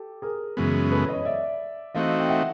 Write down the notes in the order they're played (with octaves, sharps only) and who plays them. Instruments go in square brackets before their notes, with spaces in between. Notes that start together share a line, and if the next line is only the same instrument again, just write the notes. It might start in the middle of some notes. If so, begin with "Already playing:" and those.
Already playing: [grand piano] G4 A4
G#4 A#4
[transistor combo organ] F#2 C#3 E3 G#3 B3
[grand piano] A4 B4
C#5 D#5
D5 E5
[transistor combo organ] E3 A3 C4 D#4 F#4 [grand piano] D#5 F5
[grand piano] G5
E5 F#5